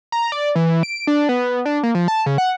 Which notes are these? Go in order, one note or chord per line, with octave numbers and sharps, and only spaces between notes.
A#5
D5
E3
D7
D4
B3
D4
A#3
F3
A5
C#3
F#5